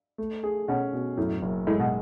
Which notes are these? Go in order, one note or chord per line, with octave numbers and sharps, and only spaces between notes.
A3
G#4
B2 C#4
B2
F#2 A2
F#1
A2 G#3
B2